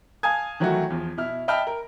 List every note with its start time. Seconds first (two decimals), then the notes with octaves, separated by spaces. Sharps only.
0.23 F5 G#5 A5 D#6 G#6
0.60 D#3 E3 F#3 A3 E4 F#4
0.90 E2 F3
1.17 B2 E4 F6
1.48 D#5 E5 G5 A5 B5 F6
1.67 A#4